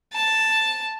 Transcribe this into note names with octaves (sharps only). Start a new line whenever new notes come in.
A5